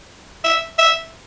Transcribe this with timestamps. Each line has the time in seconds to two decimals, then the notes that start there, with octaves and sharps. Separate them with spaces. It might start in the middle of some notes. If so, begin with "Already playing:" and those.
0.44 E5
0.78 E5